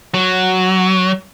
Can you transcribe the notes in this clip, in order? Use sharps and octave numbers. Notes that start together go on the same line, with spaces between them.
F#3